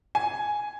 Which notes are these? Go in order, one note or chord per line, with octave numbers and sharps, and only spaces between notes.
G#5